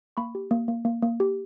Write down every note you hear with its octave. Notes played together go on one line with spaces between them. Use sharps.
A#3 B5 C#6
G4
A#3
A#3
A#3
A#3
G4